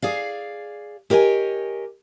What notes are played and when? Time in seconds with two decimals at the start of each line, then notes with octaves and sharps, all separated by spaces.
0.02 G#4 D5 F5
1.10 G4 A#4 C#5 D#5 G#5